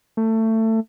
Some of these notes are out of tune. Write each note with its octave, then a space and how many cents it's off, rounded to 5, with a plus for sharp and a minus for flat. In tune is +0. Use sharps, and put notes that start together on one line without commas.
A3 +20